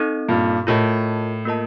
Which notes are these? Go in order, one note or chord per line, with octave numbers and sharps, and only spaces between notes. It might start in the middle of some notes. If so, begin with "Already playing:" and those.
Already playing: C4 D#4 A4 D#5
G2 A#2
A2 F4 A#4 D#5 A5
A#3 F4 A#4 D#5 A5